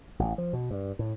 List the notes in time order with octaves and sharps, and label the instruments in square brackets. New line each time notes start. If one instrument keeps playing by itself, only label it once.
[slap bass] A1
F3
B2
G2
A2